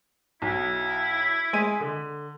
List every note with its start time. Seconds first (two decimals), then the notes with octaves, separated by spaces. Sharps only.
0.42 B1 E4
1.53 G#3 D#7
1.80 D3